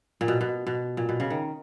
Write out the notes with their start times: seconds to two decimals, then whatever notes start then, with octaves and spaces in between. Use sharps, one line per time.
0.21 A#2
0.28 B2
0.41 B2
0.67 B2
0.97 A#2
1.09 B2
1.20 C#3
1.30 D#3